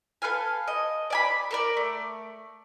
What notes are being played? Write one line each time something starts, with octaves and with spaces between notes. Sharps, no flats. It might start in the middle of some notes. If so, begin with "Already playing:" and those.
A4 B4 F5 G#5
D#5
D5 G#5 B5
A4 A#4 D5
A3